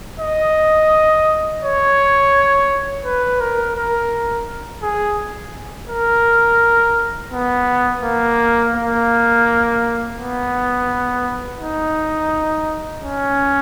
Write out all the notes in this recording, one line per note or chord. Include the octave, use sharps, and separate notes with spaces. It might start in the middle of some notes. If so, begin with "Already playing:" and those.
D#5
C#5
B4
A#4
A#4
G#4
A#4
B3
A#3
A#3
B3
D#4
C#4